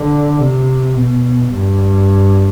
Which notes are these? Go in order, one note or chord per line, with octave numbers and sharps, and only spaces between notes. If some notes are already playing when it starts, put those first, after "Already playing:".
Already playing: D3
C3
B2
G2